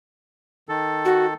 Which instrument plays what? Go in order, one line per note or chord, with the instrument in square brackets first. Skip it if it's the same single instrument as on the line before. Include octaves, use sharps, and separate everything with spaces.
[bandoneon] D#3 A4
[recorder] F#4